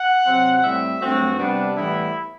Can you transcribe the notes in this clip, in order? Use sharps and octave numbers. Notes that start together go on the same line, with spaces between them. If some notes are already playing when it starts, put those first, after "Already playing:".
Already playing: F#5
C3 F#3 C4
A2 G3 C4 E5
G2 F#3 A3 C4 F#4
C3 G3 B3 D4
A2 E3 G3 B3 E4